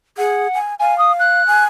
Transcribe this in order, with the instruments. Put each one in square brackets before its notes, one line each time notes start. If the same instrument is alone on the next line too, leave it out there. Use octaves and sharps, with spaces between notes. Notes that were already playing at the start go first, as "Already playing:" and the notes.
[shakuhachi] G#4 [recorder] F#5
[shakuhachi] G#5
[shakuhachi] F5 [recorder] G#5
[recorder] D#6
F#6
[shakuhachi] G#5